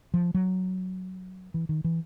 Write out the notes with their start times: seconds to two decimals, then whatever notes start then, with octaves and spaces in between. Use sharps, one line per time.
0.14 F3
0.34 F#3
1.54 E3
1.69 D#3
1.84 E3